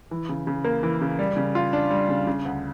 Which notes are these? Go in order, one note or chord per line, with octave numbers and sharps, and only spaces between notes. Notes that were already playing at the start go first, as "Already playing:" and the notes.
E3
C#3
C#3
A#3
E3
C#3
G3
C#3
F4
D4
G3
C#3
C#3
D2